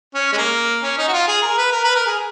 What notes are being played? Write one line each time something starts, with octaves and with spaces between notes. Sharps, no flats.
C#4
G#3
A#3
C#4
D#4
F#4
F4
G#4
A#4
B4
A#4
B4
A#4
G#4